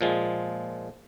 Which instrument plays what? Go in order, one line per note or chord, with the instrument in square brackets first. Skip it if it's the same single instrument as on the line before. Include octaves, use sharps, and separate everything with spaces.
[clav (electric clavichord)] A#2 F3 G#3